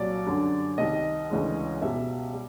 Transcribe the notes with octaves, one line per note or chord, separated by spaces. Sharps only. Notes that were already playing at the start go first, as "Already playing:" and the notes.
Already playing: C2 A#2 F#3 D5
F#2 D3 G3
C2 C3 D#3 G3 D#5
D2 C#3 E3 G#3
C#2 B2 G3 E5
G3